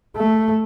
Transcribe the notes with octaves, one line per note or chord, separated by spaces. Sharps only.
A3